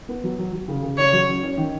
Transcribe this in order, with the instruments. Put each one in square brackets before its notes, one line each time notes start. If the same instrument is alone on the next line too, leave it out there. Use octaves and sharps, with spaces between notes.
[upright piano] B3
F#3
F#3
F#3
C#3
C#3
[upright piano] C#3 [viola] C#5
[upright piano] F#3
C#4
C#4
D#3